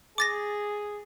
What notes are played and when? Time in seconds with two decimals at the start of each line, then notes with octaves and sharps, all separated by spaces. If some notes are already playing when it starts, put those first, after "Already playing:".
0.18 G#4 D6 A6 A#6